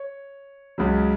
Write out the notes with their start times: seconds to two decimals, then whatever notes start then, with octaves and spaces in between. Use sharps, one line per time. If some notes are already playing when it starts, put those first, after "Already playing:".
Already playing: C#5
0.78 C#2 C#3 F#3